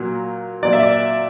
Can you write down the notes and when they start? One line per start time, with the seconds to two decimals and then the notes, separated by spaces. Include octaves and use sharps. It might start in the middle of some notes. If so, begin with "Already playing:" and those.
Already playing: A#2 F#3
0.63 A#2 F#3 D5
0.73 E5
0.83 D5